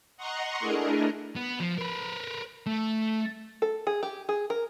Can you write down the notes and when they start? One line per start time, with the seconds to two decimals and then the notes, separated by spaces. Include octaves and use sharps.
0.17 D#5 F#5 A#5 C6 C#6
0.60 A3 D4 E4 G#4 A#4 D#5
1.36 B3
1.60 F3
1.78 A#4 B4
2.66 A3
3.62 A4
3.87 G#4
4.03 G4
4.29 G#4
4.50 A#4